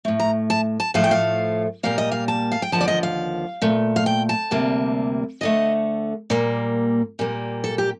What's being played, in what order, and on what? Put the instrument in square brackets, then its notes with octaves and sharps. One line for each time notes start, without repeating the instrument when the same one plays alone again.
[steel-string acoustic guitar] A2 A3
A#5
A5
A5
A2 F3 A3 F5
G5
F5
A#2 G3 A#3 F5
D#5
F5
A5
F5
G5
D#2 D3 F3 A5
D5
D#5
F5
A#2 A3
F5
G5
A5
D2 C3 G3 A#3
D2 D3 A3 D#5
A#2 G3 A#3
A#2 G3 A#3
A4
G4